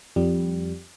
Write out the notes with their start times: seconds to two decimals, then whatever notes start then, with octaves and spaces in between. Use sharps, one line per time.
0.16 F2 G3